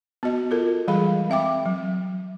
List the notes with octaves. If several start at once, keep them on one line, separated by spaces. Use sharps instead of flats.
B3 F#4 D#5
F4 A4 A#4
E3 G3 G#3 G#4 F5 B5
C4 E5 G5 D6
F#3